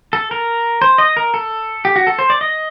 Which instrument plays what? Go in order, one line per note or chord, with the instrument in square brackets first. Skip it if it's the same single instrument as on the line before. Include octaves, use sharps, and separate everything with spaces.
[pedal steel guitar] A4
A#4
C5
D#5
A#4
A4
G4
F#4
A4
C5
D5
D#5